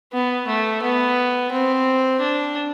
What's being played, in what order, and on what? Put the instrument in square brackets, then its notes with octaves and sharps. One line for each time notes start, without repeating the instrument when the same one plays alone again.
[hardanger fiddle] B3
A3
B3
C4
D4